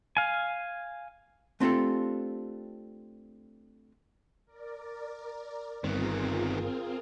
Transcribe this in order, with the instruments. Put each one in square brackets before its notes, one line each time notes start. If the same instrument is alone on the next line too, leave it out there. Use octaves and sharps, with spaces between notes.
[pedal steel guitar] F5 G#5
[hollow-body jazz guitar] A3 C4 D4 F4 G4 A4
[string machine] A#4 D5
[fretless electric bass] G1 G2 [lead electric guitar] D#3 B3 [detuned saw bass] C4 [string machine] F4 G#4 A#4